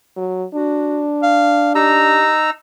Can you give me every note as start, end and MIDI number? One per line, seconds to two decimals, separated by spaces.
0.16 0.44 54
0.54 2.25 62
0.54 1.04 66
1.23 1.71 77
1.75 2.50 63
1.75 2.35 67
1.75 2.50 82
1.75 2.50 88